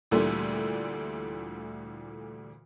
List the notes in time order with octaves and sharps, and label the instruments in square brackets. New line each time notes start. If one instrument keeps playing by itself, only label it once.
[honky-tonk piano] D2 A#2 D3 E3 G3 A3